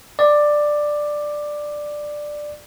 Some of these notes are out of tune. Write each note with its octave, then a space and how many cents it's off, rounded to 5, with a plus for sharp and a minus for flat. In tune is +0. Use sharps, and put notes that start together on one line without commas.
D5 +10